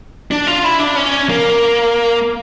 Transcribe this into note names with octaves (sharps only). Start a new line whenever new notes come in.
D4
F4
E4
D4
C#4
A#3